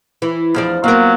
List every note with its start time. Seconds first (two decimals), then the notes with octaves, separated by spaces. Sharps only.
0.22 E3
0.55 E2 F3 D4 F6
0.84 F#3 A#3 B3 F4 A#4